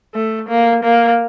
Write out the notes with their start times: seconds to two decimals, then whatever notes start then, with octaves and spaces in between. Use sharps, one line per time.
0.15 A3
0.49 A#3
0.84 A#3